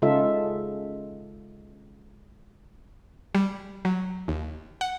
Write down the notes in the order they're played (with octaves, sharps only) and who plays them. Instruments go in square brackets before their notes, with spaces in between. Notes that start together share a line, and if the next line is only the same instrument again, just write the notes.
[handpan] C#3 G#3 D#4 F4 A4 E5
[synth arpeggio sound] G3
F#3
D#2
F#5